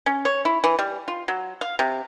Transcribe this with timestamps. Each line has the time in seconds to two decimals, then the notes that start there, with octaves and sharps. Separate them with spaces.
0.06 C#4
0.25 C#5
0.45 E4
0.64 E3
0.79 G3
1.08 F4
1.28 F#3
1.61 F5
1.79 C3